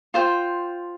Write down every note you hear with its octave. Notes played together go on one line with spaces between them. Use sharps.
F4 C5 G5